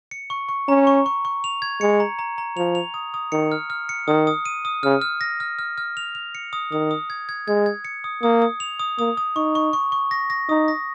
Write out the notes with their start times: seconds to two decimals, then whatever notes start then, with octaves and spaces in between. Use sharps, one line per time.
0.11 C#7
0.30 C#6
0.49 C#6
0.68 C#4 A#5
0.87 C#6
1.06 C#6
1.25 C#6
1.44 F7
1.62 G#6
1.81 G#3 C#7
2.00 A#5
2.19 A#5
2.38 A#5
2.57 F3 F7
2.75 F7
2.94 D#6
3.14 D#6
3.32 D#3 C#7
3.52 F6
3.70 F6
3.89 C#7
4.07 D#3 D#6
4.27 D#6
4.46 D#7
4.65 D#6
4.83 C#3 F6
5.02 F6
5.21 A#6
5.40 F6
5.59 F6
5.78 F6
5.97 F7
6.15 F7
6.35 C#7
6.53 D#6
6.72 D#3 D#6
6.91 D#6
7.10 G#6
7.29 G#6
7.48 G#3 G#6
7.66 G#6
7.85 C#7
8.04 D#6
8.23 A#3 D#6
8.42 D#6
8.60 F7
8.80 D#6
8.99 A#3 D#6
9.17 D#6
9.36 D#4 C#6
9.55 C#6
9.73 C#6
9.92 C#6
10.11 A#6
10.30 A#6
10.49 D#4 D#6
10.68 A#6